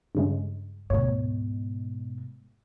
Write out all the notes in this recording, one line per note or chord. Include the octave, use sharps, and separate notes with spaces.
G2 C#3 G#3
D2 G#2 B2 C#5